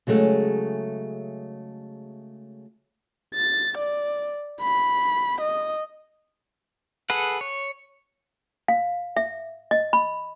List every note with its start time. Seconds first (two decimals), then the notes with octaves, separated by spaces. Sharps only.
0.07 C#3 F#3 G#3 A3
3.35 A6
3.78 D5
4.61 B5
5.41 D#5
7.10 G#4 A4 B4 F#5
7.41 C#5
8.68 F5
9.17 E5
9.71 D#5
9.93 B5